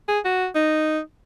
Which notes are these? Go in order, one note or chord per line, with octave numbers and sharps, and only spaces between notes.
G#4
F#4
D#4